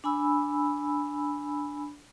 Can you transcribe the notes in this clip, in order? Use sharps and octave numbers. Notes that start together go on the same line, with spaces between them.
D4 G#5 B5 E6